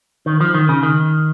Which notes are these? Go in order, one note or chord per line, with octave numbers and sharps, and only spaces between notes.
D#3
F3
D#3
C#3
D#3